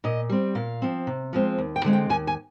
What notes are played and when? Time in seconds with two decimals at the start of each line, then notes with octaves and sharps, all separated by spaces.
0.04 A#2 D#5
0.30 G3 C4
0.55 A#2 F5
0.82 F3 C4
1.07 C3
1.33 F3 G#3 C4
1.58 D#2
1.76 G5
1.85 D3 G#3 C4
1.93 G5
2.09 D#2 G#5
2.27 G#5